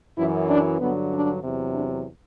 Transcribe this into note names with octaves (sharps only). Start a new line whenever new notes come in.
F#2 E3 E4
D4
G2 D3 F#3 B3
D4
E2 C3 F#3
D4